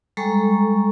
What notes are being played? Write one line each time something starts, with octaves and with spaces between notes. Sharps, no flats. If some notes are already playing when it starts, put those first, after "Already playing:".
G3 G#3 A4 A#5 C#6